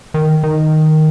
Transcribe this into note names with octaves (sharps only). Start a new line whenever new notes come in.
D#3
D#3